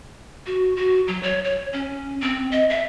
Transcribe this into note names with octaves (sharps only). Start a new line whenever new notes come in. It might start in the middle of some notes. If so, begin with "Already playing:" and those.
F#4
F#4
F#3
C#5
C#5
C#4
C4
D#5
E5